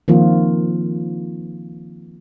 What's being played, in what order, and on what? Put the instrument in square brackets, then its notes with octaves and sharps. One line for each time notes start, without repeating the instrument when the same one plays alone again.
[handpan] D#3 F3 A#3 C4 F4